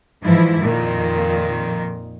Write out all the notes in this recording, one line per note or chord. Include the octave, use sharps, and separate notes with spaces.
G#2 E3 F3 E4
F2 A#2 D#3